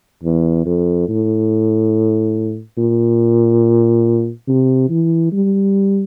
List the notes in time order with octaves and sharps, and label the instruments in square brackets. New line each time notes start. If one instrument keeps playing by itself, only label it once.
[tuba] E2
F2
A2
A#2
C3
E3
G3